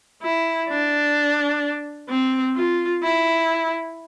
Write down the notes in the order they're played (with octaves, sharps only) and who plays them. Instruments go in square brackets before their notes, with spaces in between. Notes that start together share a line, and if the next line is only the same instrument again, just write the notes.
[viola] E4
D4
C4
F4
E4